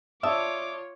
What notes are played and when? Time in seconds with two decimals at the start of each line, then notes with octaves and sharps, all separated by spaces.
0.23 F4 C#5 D5 E5 A5 D6 D#6